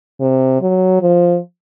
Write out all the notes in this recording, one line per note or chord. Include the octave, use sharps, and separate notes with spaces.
C3
F#3
F3